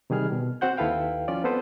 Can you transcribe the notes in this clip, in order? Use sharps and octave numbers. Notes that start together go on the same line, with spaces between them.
C3 D#3 G3 G#4 F6
B2
C4 F#4 C5 F#5 G6
D#2 E4 A4 B4 F5 G5
F3 C#4 F4 D5
B3 C4 A4 B4 C5